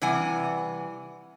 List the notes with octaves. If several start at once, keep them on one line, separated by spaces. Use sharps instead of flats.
C3 E3 G3 F#5 G#5